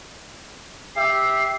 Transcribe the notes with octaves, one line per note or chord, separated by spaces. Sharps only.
G4 E5 C7